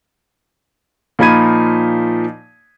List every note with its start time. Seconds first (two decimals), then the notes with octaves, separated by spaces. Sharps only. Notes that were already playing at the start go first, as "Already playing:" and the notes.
1.19 A#2 F3 D#4 B5 G#6 D#7